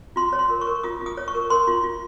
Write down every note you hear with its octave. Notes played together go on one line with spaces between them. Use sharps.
F4 C6
C#5
C6
A#4
C#6
A#4
F4 D#6
F4
D#6
C#5
C#6
A#4
A#4 C6
F4
F4